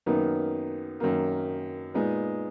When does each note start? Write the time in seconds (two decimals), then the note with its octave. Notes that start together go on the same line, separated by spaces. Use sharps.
0.06 F#2 D#3 A#3 B3 D#4
1.00 F#2 D#3 A#3
1.94 A#2 G#3 B3 D#4